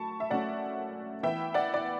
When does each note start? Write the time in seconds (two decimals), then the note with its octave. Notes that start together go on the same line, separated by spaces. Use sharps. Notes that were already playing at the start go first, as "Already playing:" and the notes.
Already playing: F#3 A3 A5 B5 C#6
0.20 E5
0.30 F#3 A3 C#4 D5 F#5
1.23 E3 B3 E4 E5 G5
1.54 D5 F#5
1.74 D5